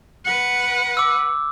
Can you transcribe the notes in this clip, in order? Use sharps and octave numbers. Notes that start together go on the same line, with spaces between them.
B4 F#5
D6 E6